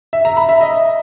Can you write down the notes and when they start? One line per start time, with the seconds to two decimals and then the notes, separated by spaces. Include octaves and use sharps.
0.13 E5
0.25 A#5
0.37 B5
0.49 E5
0.61 D#5